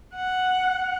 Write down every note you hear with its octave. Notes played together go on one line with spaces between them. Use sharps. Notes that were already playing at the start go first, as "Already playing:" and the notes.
F#5